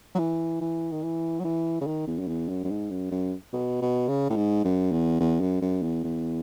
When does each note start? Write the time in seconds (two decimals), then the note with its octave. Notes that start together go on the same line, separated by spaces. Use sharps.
0.15 F#3
0.19 E3
0.61 E3
0.92 D#3
1.03 E3
1.40 F#3
1.44 E3
1.81 C#3
1.86 D#3
2.07 E2
2.19 F#2
2.28 E2
2.48 F#2
2.64 F#2
2.70 G#2
2.90 F#2
3.11 F#2
3.53 B2
3.81 B2
4.08 C#3
4.29 A2
4.36 G#2
4.64 F#2
4.92 E2
5.20 E2
5.41 F#2
5.62 F#2
5.82 E2
6.04 E2